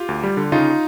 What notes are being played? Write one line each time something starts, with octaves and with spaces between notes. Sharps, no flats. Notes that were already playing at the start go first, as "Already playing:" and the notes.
Already playing: F4 G4
D2
G3
D3
C#3 D#4 F4